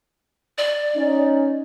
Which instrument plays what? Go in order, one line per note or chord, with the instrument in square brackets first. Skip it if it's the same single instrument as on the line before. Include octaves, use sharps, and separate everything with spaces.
[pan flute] D5
[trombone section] C#4 D#4